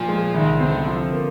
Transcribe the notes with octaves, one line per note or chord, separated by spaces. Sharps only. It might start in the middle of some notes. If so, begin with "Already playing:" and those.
Already playing: A#2 F3
G#3
C2 D#3
D3 C4
F3
A#3